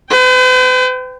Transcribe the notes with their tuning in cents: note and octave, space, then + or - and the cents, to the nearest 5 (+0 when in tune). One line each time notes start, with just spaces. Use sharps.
B4 +45 G5 +0